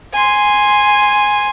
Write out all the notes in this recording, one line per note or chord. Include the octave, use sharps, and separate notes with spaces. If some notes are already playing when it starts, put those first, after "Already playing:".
G#5 C6